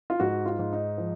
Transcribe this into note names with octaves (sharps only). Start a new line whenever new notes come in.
F4
G#2 F#4
F4
G#2
D#4
F3